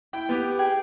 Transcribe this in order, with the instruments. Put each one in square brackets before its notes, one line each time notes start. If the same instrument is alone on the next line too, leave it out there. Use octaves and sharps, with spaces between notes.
[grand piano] E4 [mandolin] G5
[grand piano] B3 G4
[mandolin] G#4 G5 G#5